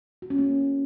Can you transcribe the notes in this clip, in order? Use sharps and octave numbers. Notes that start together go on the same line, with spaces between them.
F#4
C#4
A#3